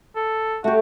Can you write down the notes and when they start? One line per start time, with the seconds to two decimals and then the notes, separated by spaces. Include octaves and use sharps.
0.16 A4
0.64 A3 F#4 G4